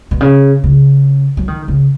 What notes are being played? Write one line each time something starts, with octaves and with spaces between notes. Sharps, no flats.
B2
C#3
C#3
F#3
D#3
C#3